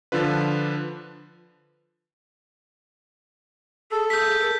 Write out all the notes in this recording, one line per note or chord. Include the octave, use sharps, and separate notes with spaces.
D3 F3 D4 F4 B4
G#4 A4
G#4 G6 B6
A#4